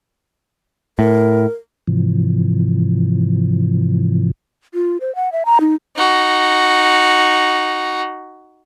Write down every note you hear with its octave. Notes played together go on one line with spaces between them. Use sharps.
A2 A#4
G#2 C3 E3 F3
F4
C5
F#5
E5
A#5
D#4
D#4 F#4